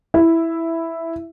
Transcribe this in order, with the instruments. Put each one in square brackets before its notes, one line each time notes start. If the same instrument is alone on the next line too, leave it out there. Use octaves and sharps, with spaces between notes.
[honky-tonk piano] E4